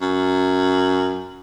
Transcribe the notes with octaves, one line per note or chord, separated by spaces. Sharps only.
F#2